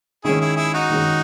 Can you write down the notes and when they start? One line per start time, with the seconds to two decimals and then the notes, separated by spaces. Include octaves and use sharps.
0.24 D#3 G#3 C#4 E4 G#4
0.41 E4 G#4
0.56 E4 G#4
0.74 D#4 F#4
0.89 D#3 G#3 C#4